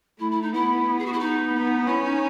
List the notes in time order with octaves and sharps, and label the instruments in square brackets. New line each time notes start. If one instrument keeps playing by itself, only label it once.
[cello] A3 [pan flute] E4
[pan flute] E4
D#4
[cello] B3 [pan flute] E4
[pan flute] G#4
F#4
E4
D#4
[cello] B3
[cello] C#4 [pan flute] E4
[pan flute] D#4